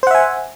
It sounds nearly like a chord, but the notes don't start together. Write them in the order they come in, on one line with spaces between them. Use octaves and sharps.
C5 F#5 E5 G#5